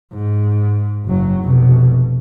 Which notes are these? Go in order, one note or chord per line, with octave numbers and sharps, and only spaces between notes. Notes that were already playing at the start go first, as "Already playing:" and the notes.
G#2
F#1 F#3
F1 B2